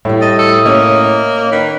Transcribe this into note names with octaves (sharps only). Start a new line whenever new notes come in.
A2 G3 A3
D#5 A5
A4 D#6
A#3 C#4 C#5 D#5
D#3 B4